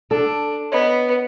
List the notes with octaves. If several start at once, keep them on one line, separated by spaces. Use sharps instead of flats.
D4 A4
B3 C#5 D#5 B5